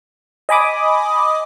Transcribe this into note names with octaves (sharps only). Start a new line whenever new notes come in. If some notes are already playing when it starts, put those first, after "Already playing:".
D#5 G#5 B5 D6 D#6